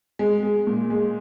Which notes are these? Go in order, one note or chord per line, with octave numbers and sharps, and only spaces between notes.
G#3
G#3
A#2
G#3